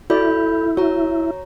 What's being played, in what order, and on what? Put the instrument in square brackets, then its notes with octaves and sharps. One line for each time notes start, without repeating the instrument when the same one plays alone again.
[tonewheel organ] E4 [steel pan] F#4 D5 [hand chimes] A4 B5 G6
[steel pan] F#4 [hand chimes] C#5 A#5